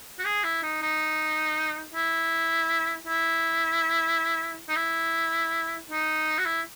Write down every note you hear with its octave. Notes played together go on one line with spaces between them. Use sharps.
F#4
G#4
E4
D#4
D#4
E4
E4
D#4
E4
D#4
F#4
E4